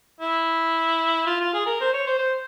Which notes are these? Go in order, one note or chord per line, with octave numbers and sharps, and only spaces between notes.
E4
F4
F4
G#4
A#4
C5
C#5
C5
C5